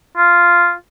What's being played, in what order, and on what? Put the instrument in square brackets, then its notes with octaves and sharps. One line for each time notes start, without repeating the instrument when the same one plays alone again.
[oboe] F4